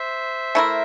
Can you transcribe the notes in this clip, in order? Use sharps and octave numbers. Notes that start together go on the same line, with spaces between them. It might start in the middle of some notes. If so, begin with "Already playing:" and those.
Already playing: C5 E5
A3 E4 A#4